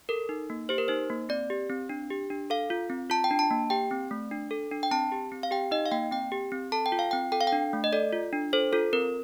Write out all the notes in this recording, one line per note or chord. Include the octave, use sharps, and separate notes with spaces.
A4 A#4
D#4
A#3
G4 C5
A#4
D#4 C5
A#3
C4 D5
G4
C4
D4
G4
D4
A4 F5
F4
C4
F4 A5
G5
D4
A5
A#3
G4 G5
C4
A3
D4
A4
D4
G5
C4 A5
G4
C4
F5
G4 G5
D#4 D#5
F5
A#3 G5
C4 G5
G4
C4
A4 A5
G5
F4
F5
C4 G5
A4 G5
F5
G5
D4
A3
D#5
A4 D5
F4
D4
A4 C5
F4 A4
C4 A#4